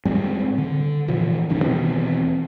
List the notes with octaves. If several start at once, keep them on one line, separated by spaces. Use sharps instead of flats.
A2 G3 G#3 C4
D3
A#2 E3 F3
F#1 C2 D#3 C#4
D#2 B2 E3 C4